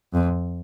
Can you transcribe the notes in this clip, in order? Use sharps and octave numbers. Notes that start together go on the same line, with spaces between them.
F2